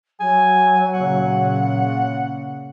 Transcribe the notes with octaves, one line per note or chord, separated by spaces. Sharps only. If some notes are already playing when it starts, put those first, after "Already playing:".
F#3 G#5
A#2 C#3 F#5